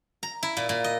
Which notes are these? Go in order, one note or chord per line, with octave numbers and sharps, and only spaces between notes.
A#5
E4
A#2
A#2
D#5